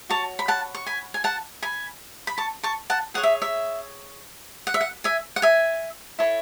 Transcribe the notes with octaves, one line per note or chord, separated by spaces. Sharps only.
F#4 C#5 A5 C#6
B5
F#5 A5
C#6
G#5 B5
G#5
F#5 A5
G#5 B5
B5
A5 C#6
A5 C#6
F#5 A5
G#4 C#5 F#5
E5
E5
F#5
E5
F#5
E5 G#5
F#5
E5 G#5
E4 A4 C#5